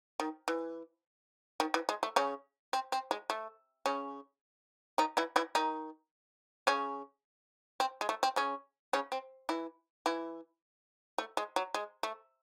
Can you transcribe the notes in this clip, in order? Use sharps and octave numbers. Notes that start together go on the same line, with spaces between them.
D#3
E3
D#3
E3
G#3
A3
C#3 C#4
C4
C4
G#3
A3
C#3 C#4
D#3 D#4
E3 E4
E3 E4
D#3 D#4
C#3 C#4
C4
G#3
A3
C4
C#3 C#4
C#3 C#4
C4
E3 E4
E3 E4
A3
G#3
F#3
G#3
A3